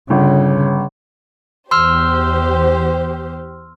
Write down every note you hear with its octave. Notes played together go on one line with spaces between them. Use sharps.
G1 C#3
E2 G4 C5 C6 E6 F6